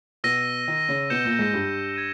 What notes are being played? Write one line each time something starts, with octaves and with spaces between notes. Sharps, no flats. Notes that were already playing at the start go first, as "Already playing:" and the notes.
B2 B3 E6 A#6 D#7
D#3 D#4
C#3 C#4
B2 B3 G6 C#7 E7 G7
A#2 A#3
G#2 G#3
G2 G3
G#6 D#7